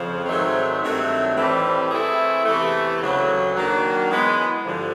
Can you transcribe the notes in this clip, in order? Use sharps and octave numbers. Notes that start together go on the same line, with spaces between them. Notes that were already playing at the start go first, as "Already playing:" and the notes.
Already playing: F2 C#3 F3
G#2 D#3 F#3 A3 C4
G2 D#3 F#3 A3 C4
A2 E3 G3 C4
E3 A3 C4 E4 G#4
E2 C3 E3 A3
D2 C#3 F#3
D#3 F#3 A#3 D4 F#4
E3 G#3 B3
G2 D3 F3